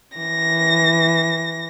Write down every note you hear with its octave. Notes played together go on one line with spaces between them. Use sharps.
E3 A#6